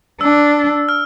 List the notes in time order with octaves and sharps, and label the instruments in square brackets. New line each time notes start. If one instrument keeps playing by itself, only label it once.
[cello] D4 [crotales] E6
[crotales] F6